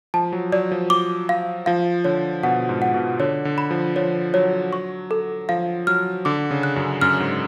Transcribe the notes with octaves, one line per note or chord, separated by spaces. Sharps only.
F3 A5
F#3
F#3 D5
F3
D6
F5
F3 F5
D3 C#5
B2 F#5
G#2
F#5
B2
D3 C#5
D3
B5
F3
F3 C#5
F#3 C#5
C#6
A4
F3 F5
F#3 F6
D3 D6
C#3
F#6
F#2
F#2 F6
G#2